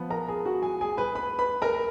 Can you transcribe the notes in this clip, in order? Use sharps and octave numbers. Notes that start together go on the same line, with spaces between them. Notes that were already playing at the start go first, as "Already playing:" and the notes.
Already playing: F3 B3
A#4 A#5
G#4 G#5
F#4 F#5
G#4 G#5
G#4 G#5
B4 B5
B4 B5
B4 B5
A#4 A#5